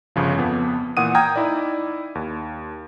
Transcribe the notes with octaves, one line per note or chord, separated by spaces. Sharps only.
G1 C#3 F3
F2 F3 B3
A#2 E3 F#5 D#6 D#7
G5 A#5 D#6 F6 G#6
D#4 E4 D5
D#2